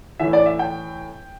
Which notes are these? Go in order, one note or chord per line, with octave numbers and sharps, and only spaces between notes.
A2 E3 E5
D5
E5
G5